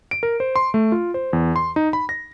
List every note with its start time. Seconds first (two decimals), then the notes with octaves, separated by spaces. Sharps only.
0.11 D7
0.23 A#4
0.40 C5
0.56 C6
0.74 A3
0.92 F4
1.14 C5
1.33 E2
1.56 C6
1.76 D#4
1.93 B5
2.09 A#6